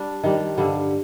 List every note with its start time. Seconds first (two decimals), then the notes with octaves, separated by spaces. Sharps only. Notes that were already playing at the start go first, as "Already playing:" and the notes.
Already playing: G3 D4
0.24 D#3 G3 D4
0.58 G2 D3 G3